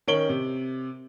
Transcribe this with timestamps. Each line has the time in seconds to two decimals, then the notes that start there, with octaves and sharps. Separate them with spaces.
0.07 D#3 C#4 C#5 D7 F#7 G7
0.29 C3